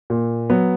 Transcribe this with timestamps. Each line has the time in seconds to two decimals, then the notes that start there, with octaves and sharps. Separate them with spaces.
0.10 A#2
0.50 F#3 B3